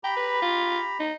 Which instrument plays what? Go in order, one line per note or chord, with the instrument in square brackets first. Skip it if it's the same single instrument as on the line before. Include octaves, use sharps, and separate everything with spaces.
[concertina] G4 A#5 B5 [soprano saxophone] G5
[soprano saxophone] B4
F4
D#4